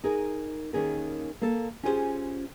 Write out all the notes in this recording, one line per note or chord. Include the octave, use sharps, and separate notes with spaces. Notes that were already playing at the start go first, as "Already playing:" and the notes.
D#4 G#4 A#4
D#2 D#3 C#4 G#4 A#4
A#3 A4
C#4 F4 G4 G#4 B4 C5